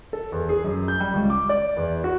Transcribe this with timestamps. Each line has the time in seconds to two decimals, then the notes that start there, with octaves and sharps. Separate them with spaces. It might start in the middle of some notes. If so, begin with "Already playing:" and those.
0.13 A4
0.32 E2
0.49 G#4
0.64 F#2
0.88 G6
1.00 G3
1.14 C#2
1.30 D6
1.49 D5
1.77 E2
2.04 F#4